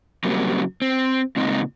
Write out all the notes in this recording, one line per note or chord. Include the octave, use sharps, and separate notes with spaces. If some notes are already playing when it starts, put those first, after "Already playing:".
C#3 F#3 G3 A#3 C4
C4
A#2 C#3 G#3 C4 D#4